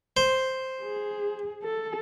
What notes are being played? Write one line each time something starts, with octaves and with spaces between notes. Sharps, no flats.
C5
G#4
A4